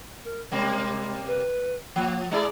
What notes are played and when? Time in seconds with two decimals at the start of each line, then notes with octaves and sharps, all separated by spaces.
0.24 A#4
0.51 C3 G3 G#3 A#3
1.27 B4
1.96 F3 A#3
2.31 G#3 E4 G#4 D5